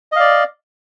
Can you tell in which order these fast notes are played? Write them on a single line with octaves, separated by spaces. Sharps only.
D#5 F5 D5